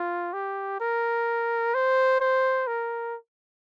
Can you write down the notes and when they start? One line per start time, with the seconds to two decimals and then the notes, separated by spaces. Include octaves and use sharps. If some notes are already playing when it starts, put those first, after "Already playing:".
Already playing: F4
0.33 G4
0.81 A#4
1.74 C5
2.20 C5
2.67 A#4